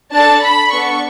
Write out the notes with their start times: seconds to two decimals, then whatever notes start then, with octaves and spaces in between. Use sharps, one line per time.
0.13 D4 A4 A5
0.43 B5
0.73 B3 D4 A4 C#6